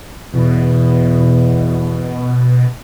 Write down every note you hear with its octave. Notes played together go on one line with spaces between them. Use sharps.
E2 B2